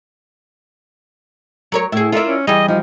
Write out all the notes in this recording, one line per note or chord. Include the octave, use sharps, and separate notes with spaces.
F#3 A#4 C#5
A2 E4 G#4
E4 F4 A4 A#4 D5 E5
C#4
E3 G3 G#4 D#5
F3 D#4